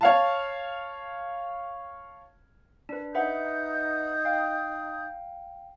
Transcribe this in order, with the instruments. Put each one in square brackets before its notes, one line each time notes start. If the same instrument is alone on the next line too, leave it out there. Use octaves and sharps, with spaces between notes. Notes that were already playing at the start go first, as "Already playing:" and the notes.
[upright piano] C#5 F5 A5
[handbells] D4 B4
[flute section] D#4 D#6 G6 [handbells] B4 E5 F#5
[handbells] F5 G5